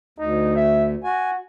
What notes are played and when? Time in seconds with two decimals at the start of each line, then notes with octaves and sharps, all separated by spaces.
0.19 D2 D#4
0.56 E5
1.04 F#4 G#5